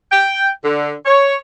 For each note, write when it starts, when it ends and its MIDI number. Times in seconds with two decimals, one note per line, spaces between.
0.12 0.49 79
0.64 0.92 50
1.05 1.36 73